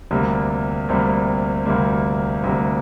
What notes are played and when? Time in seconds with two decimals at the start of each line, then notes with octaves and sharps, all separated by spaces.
0.11 D2 C3 G3 A#3
0.89 D2 C3 G3 A#3
1.66 D2 C3 G3 A#3
2.44 D2 C3 G3 A#3